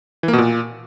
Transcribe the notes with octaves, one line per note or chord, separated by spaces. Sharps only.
E3
A#3
B2
A#2